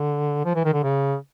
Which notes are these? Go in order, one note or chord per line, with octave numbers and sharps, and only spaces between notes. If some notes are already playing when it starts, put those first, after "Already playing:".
Already playing: D3
F3
E3
D#3
D3
C#3